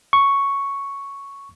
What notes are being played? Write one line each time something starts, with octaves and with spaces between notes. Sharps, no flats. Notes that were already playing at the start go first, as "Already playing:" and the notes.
C#6